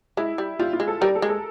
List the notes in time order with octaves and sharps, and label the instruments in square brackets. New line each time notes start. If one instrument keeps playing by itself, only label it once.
[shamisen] G#3 [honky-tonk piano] E4
[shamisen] G3
[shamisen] G3 [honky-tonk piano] F4
[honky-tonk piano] F4
[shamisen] G#3
[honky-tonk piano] A4
[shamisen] G3 [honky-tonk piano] A#4
[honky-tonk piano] A4
[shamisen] G#3
[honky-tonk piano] A4